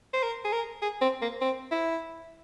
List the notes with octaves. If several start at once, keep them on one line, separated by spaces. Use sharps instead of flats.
C5
A#4
G#4
A#4
G#4
C4
A#3
C4
E4